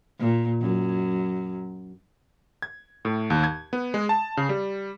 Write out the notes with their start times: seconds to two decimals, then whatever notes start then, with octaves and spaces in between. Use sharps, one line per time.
0.19 A#2
0.61 F#2
2.62 G#6
3.05 A2
3.30 D#2
3.44 G#6
3.73 B3
3.94 G#3
4.09 A5
4.37 C#3
4.49 G3